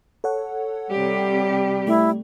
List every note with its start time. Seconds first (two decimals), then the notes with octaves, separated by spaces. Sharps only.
0.24 A4 C#5 F#5
0.91 C3 G3 G4
1.87 A3 E4